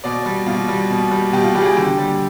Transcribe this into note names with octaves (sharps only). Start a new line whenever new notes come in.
B2 D5
G3
B2 F4
G3
B2
G3
B2 G4
F4
G3 G4
G#4
G4
D3 G4
G3